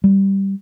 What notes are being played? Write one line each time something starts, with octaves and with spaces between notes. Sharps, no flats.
G3